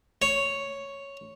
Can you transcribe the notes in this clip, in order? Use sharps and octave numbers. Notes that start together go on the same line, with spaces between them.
C#5